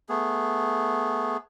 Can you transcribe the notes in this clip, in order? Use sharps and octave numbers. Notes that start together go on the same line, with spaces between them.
A3 B3 G#4